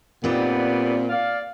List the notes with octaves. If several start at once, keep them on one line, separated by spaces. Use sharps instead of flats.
A#2 G3 B3 C4 D#4
D5 F5